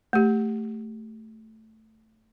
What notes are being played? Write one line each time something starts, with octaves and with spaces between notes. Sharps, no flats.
A3 G4